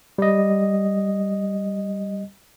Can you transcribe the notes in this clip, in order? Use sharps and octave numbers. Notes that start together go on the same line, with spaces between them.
G3 D#5